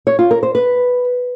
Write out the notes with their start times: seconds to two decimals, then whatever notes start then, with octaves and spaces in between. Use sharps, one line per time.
0.07 C#5
0.19 F4
0.31 A#4
0.43 C5
0.55 B4